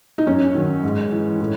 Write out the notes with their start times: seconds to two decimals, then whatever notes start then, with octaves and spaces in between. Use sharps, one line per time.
0.18 D#4
0.26 F#2 C#4
0.55 D#3 F#3
0.83 G#2
1.12 E3
1.40 A2